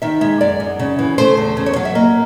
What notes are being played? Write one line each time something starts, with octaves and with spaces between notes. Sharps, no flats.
D#3 E5
G#3 E5
F#2 D5
F#2
C#3
E3
A3 C5
E2
C#3 C5
C#5
F#3 F5
E5
A#3 D#5